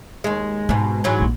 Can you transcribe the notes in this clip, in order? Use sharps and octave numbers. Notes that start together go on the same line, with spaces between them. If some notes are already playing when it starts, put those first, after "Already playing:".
D#2 G#3
G#2 B2 G#3
G#2 E3 F#3
A#1 A#3